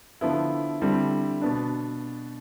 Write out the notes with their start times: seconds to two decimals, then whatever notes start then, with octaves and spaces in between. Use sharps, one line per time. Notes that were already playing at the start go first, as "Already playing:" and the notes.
0.21 D3 F3 B3 E4
0.82 D3 G3 C4 E4
1.42 B2 B3 D4